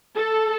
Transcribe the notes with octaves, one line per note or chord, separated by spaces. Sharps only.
A4